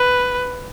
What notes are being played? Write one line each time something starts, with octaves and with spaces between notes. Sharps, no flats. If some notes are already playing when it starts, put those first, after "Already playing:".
Already playing: B4